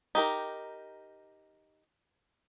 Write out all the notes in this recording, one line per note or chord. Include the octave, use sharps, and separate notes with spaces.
D#4 G4 A#4